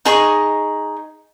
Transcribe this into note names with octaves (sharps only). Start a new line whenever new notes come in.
D#4 G#4 D#5 C#6